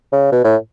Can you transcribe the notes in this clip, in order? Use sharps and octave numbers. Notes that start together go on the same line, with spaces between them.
C#3
B2
A2